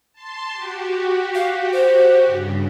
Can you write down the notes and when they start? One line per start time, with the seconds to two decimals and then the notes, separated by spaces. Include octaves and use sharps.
0.13 A5 C6
0.52 F#4 G4
1.35 F5
1.72 C5
2.25 G2 C#3